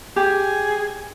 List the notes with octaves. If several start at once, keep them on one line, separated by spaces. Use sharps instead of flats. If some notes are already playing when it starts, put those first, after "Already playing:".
G4 G#4